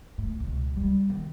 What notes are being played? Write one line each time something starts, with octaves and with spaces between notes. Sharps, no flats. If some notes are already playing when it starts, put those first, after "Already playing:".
A2
C#2 B2
G3
D#3